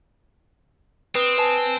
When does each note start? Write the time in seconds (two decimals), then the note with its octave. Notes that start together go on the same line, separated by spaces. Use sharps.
1.15 C4 B4 D#6
1.38 B4 G#5 A5